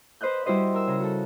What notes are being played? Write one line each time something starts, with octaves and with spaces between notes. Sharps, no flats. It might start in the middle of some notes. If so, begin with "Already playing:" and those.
B4 C5 D#5 F#6 G6
G3 E4 F#4 C5 D#5
A#4 E6
C#3 A#5
F#4 A4